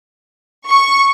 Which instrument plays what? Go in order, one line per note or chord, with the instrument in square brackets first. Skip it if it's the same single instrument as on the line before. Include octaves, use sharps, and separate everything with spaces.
[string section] C#6